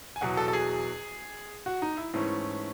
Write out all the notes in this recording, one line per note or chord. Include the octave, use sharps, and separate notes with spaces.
G#5
E2 B2 F#3 F#5
A4
A4
G#4
F#4
D#4
E4
G#2 E3 A3 C#4 E4